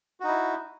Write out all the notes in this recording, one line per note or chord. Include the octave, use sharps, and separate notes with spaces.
D#4 E4 F#4